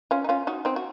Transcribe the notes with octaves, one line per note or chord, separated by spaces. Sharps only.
C#4 F4
D#4
C#4 F4
D#4 F#4
C4 D#4
F#4